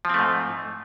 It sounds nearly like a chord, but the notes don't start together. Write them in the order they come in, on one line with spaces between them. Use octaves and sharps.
F3 C4 A3 G#2